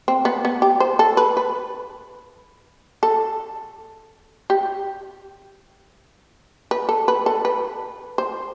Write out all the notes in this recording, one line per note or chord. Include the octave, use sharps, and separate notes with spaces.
C4
B3
B3
G4
C5
A4
B4
B4
A4
G4
B4
A4
B4
A4
B4
C5